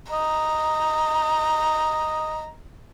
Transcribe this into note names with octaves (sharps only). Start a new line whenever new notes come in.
D#5 A#5